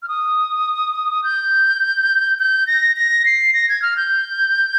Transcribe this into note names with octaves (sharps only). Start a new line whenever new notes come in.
F6
D#6
G6
G6
A#6
A#6
C7
A#6
G#6
F6
G6